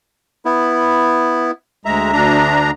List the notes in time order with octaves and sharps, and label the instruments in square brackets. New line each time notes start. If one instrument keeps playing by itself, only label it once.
[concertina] B3 E4
[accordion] D2 G#3 A#5 [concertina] E5
[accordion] D2 D4 A#5